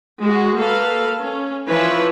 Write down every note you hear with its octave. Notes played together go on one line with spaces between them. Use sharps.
G#3 F#4
A#3 A4 B4 F5
C#4
E3 F3 E4 F4 B4 C#5